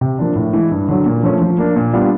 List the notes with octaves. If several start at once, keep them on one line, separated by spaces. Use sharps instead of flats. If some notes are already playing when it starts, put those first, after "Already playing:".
C3
F3 A#3 D4
A2
E3 G#3
G2
D3 F#3
A#2
F3 A3 C#4
F3
A#3 D4
A#2
G3 B3 D4 F4